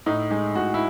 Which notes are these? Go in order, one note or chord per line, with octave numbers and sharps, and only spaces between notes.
A2 D#4
G#3 D#4
A2 F#4
E4